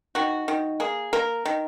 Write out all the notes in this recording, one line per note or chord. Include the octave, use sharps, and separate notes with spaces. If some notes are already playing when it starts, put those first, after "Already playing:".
D#3 F#4
D#3
A#3 G#4
A#3 A#4
D#3